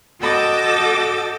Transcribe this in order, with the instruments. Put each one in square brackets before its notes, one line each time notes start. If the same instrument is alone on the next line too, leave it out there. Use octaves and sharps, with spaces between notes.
[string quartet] F#4 A4 D#5 G5 D6 E6